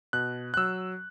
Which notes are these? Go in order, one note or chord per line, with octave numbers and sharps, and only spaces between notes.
B2 F#6
F#6
F#3 E6